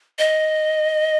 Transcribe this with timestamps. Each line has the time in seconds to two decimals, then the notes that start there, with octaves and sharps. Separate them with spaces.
0.19 D#5